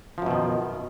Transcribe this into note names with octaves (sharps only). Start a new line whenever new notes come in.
F#2 B2 D#3 F3